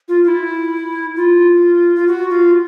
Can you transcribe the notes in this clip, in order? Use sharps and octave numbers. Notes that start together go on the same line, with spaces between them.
F4
F4
E4
F4
F4
F#4
F4